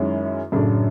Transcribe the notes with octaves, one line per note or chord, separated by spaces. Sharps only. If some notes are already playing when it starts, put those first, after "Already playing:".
Already playing: F#2 D#3 G#3 C#4 E4
F#2 A2 C#3 F#3 A3 D4